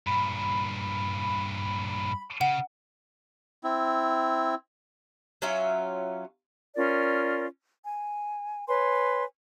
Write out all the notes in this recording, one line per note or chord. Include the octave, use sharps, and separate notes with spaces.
G2 A#2 B5
C#3 F#5
C4 E4
F#3 C#4 F4 E5
C#4 F4 A#4 D5
G#5
B4 C#5 G#5 C6